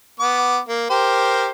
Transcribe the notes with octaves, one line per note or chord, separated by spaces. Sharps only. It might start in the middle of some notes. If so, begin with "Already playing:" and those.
B3 D6
A#3
G4 A#4 C5